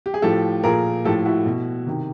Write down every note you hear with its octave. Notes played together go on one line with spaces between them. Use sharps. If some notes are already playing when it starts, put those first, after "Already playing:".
G4
G#4
A2 F3 G4 A4
A#2 F3 G#4 A#4
A2 F3 G4 A4
E4 F#4
B2
C3 D#3